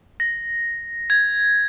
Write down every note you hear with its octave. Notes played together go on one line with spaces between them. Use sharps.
A#6
G#6